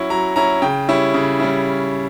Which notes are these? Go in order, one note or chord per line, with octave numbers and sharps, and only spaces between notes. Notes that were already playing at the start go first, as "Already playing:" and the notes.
Already playing: F#3 C#4 E4
F#3 A#5
C#4 E4 A#5
C#3 G5
G3 C#4 E4
C#3
G3 C#4 E4